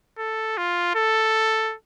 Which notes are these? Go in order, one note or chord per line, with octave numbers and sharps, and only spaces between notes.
A4
F4
A4